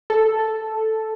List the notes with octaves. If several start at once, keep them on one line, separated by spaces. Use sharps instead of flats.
A4